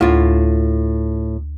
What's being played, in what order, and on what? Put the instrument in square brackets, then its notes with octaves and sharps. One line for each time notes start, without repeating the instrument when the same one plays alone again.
[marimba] D2 [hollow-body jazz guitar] A2 F4